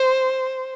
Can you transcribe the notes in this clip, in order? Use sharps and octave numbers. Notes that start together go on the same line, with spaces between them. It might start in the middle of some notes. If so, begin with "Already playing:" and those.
Already playing: C5